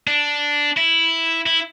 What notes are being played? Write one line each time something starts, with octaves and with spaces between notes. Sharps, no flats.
D4
E4
E4